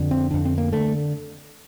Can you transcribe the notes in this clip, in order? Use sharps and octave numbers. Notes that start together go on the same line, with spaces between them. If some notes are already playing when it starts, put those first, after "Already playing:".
Already playing: F2 D3
C4
F2 D3 D4
C4
A#3
D3 A3